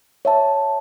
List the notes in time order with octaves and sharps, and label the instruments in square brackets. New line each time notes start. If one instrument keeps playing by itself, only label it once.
[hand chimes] C#5 E5 A5